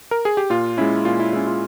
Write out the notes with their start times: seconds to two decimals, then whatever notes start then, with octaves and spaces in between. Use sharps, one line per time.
0.11 A#4
0.25 G#4
0.37 G4
0.50 A#2 F4
0.77 G#3 C#4 E4
1.05 A#2 F4
1.19 E4
1.33 G#3 C#4 E4
1.47 F4